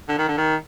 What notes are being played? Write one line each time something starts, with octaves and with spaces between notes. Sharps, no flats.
D3
D#3
D3
D#3